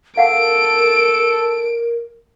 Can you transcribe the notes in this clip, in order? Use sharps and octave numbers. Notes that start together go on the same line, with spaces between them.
A4 A#4 F5 F#5 D7